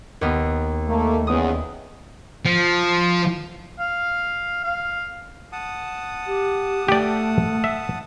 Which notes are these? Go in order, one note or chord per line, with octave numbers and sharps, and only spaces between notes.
D#2 B3 F6
A3 A#3
E2 C#3 B3 D#6
F3
F5
F5
F#5 A5 D#6
G4
A3 G4 D5
E5